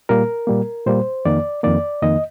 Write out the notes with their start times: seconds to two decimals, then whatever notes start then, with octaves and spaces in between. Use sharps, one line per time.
0.09 A#2 G3 A#3 A#4
0.47 A#2 G3 A#3
0.87 A#2 G3 A#3 C5
1.25 F2 D#3 A#3 D5
1.63 F2 D#3 A#3 D5
2.02 F2 D#3 A#3 D#5